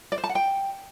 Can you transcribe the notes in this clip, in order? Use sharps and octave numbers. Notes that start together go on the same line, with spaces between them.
D5
C5
A5
F#5
G5